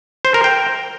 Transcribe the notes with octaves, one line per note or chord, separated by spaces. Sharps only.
C5
A#4
G5